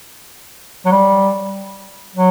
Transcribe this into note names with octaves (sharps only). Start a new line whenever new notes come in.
F#3
G3
F#3